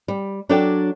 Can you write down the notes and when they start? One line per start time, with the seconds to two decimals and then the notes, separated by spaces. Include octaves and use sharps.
0.08 G3
0.49 F#3 D4 A4 D5 G5